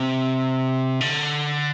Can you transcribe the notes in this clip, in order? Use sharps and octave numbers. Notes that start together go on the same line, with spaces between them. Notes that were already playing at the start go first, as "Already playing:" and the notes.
Already playing: C3
D3